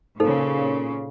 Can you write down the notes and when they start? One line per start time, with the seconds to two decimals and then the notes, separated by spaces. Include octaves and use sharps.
0.20 A#2 C#3 D#4 A4 C5